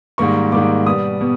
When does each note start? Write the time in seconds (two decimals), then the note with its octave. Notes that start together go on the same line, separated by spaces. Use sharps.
0.18 G#2 D#3 G3 A#3 C#6
0.52 G#2 D#3 G3 A#3 D6
0.86 B2 G3 B3 D#6
1.21 B2 G3 B3